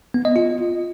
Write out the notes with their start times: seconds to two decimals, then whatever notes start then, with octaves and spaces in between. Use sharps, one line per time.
0.14 B3
0.25 D#5
0.36 F4